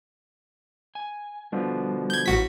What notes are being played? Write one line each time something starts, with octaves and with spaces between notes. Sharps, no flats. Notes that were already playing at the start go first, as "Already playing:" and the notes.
G#5
B2 D3 F3 G3
G6 G#6
A1 F#4 B6